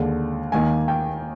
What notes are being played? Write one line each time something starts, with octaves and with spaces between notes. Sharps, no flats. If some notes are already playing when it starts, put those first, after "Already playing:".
Already playing: D#2 D3 G#3
D#2 D#3 A#3 G#5
G5